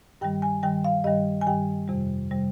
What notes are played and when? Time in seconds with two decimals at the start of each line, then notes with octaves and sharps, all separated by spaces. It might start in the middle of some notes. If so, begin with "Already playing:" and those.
0.21 G2 D#3 G3 G5
0.42 G#5
0.63 G2 D#3 G3 G5
0.84 F5
1.04 G2 D#3 G3 D#5
1.41 G#5
1.46 G2 D#3 G3 G5
1.88 F2 C3 G3
2.31 C3 G3